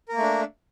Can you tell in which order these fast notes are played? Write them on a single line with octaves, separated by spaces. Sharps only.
A#4 A#3 A3 D4